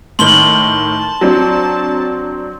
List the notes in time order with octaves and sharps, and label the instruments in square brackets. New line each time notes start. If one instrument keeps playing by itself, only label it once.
[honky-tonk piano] A2 D#3 [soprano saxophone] A5 [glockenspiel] C6 F#7 G7
[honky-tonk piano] F#3 C4 D4